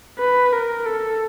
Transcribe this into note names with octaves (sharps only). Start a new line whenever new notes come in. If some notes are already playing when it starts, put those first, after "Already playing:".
B4
A#4
A4